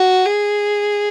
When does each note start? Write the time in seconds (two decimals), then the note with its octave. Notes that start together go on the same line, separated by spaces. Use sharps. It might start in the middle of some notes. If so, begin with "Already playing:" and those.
Already playing: F#4
0.26 G#4